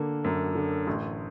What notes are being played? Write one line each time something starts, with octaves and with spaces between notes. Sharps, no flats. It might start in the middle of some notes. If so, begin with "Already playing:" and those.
Already playing: D3 A#3
F#2
D3
A1